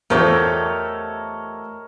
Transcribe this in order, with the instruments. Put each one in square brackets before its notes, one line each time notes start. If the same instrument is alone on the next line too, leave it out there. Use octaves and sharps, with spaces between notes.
[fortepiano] E2 F3 [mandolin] A3 G4 A4 [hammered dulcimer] A#4 C#5 D#5